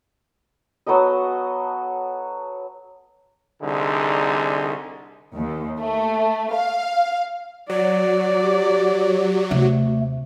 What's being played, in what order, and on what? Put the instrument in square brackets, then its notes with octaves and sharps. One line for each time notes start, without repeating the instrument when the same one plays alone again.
[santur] F#3 B3 A4 D#5
[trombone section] C2 D3 D#4 G#4
[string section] D#2
A3
F5
[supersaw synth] F#3 [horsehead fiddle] D5
[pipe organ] G4
[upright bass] D#2 C3 [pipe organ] A3